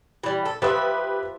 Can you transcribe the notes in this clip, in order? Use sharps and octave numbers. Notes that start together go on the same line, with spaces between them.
E3 G3
A4
F3 G4 B4 E5 D#6